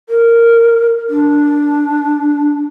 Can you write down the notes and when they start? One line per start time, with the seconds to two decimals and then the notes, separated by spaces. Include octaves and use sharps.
0.09 A#4
1.09 D4